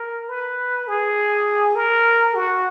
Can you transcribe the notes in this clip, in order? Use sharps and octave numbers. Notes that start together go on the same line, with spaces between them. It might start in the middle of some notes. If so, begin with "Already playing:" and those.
Already playing: A#4
B4
G#4
A#4
F#4